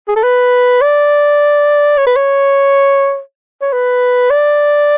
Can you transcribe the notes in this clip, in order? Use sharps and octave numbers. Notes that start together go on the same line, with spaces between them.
G#4
A4
B4
D5
C#5
B4
C#5
C#5
B4
D5